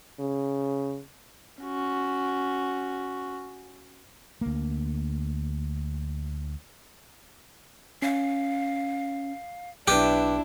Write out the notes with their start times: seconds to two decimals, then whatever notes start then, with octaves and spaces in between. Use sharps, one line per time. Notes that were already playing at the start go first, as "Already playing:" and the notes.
0.20 C#3
1.61 C#4 F#4
4.41 D2 A#3
8.02 C#4 F5
9.88 B1 D4 E4 G4 B4